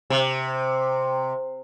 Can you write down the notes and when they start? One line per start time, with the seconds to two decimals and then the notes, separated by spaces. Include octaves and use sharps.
0.10 C3